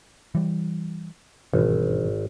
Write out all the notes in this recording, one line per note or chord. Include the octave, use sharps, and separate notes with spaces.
E3 G3
G#1 G2 B2 E3